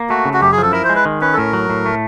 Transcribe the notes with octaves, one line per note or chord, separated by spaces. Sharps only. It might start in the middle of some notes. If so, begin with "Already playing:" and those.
Already playing: A#3
A3 F#4
C#3
F#4
F#2 G4
G#4
F3 A4
E4 A#4
C5
G#3
B4
D#3
C#4 B4
A4
A2 A#4
F#3
A2
A3